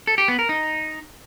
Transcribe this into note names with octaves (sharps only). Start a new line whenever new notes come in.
A4
G4
B3
A#4
D#4